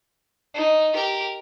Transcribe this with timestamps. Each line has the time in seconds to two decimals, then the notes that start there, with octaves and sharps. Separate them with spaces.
0.54 D#4
0.93 G4 A#4